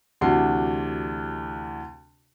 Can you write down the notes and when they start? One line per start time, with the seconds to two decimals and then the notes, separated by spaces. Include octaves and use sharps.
0.21 D2 C3 E3 D4 F#4 C7